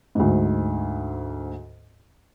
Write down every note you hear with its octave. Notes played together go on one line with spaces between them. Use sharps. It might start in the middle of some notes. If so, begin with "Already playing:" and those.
D2 G#2